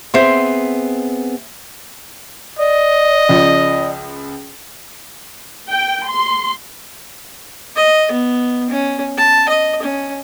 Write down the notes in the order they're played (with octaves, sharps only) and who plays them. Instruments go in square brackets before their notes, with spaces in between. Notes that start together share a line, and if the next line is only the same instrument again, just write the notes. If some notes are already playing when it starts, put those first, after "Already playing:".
[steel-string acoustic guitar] B3 C4 G#4 [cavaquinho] C5 E5 C6
[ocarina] D5 [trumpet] D#5
[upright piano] C#2 F3
[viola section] G5
C6
[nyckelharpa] D#5
B3
C#4
A5
D#5
C#4